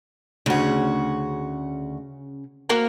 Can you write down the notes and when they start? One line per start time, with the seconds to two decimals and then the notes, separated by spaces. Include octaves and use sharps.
0.46 D2 C#3 F#4
2.69 A#3 F#4 A#4